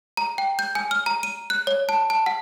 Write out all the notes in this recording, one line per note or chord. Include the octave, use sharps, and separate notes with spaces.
A#5
G5
G6
G#5
F6
A#5
D#7
F#6
C#5
A5
A5
F#5